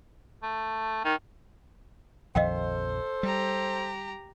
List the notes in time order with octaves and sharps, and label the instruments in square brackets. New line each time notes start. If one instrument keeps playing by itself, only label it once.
[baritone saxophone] A3
D#3
[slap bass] A#1 F2 D#3 [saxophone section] A4 C5 [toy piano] D#5 F5 G5
[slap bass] G3 [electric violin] G4 A#5